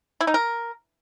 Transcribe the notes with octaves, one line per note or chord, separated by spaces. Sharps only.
E4
D#4
A#4